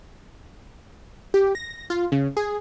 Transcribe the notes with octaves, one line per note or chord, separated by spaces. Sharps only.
G4
A#6
F4
C#3
G#4